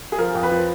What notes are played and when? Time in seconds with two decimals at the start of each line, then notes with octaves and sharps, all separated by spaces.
0.12 G#4
0.18 F3 A#4
0.35 F2
0.43 B4
0.51 F3